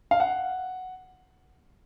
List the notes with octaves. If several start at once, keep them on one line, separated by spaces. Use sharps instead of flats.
F5
F#5